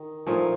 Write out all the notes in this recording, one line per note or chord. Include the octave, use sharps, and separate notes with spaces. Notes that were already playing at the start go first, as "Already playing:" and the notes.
Already playing: D#3
A#2 F3 A3 D#4